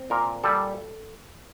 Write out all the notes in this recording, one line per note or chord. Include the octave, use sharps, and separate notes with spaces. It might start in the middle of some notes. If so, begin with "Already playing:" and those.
Already playing: C4
A#2 A#4
G3 A4